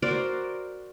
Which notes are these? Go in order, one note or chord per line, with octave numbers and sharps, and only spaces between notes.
F#4 A#4 C5 D5